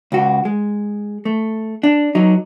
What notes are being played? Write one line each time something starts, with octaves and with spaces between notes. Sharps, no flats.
C#2 F#4
G#3
A3
D4
F#3 D#4